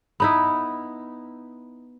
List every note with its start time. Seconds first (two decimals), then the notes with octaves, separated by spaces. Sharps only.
0.20 B3 D#4 E4